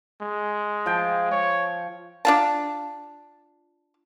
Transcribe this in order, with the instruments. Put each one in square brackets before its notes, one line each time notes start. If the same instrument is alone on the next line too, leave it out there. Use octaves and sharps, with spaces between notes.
[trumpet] G#3
[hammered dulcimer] F3 G5
[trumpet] C#5
[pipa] D4 F4 A5